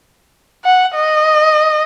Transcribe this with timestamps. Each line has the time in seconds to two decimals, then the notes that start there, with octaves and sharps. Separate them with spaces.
0.65 F#5
0.95 D#5